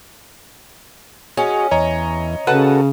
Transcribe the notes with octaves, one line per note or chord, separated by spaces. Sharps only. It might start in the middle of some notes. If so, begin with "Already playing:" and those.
C#4 F#4 G#4 C#5 D#5
E2 C#5 D#5 A#5
C#3 F#4 A4 B4 F#5 A5